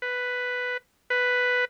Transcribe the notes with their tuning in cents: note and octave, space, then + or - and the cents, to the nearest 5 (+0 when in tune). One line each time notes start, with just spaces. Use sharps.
B4 +5
B4 +5